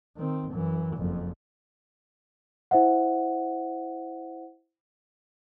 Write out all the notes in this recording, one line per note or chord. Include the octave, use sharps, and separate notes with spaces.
D#3 C4
F#2 E3
F#1 F2
E4 C5 E5 F#5